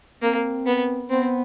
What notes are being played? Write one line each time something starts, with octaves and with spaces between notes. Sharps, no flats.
A#3 C4
B3
B3 C4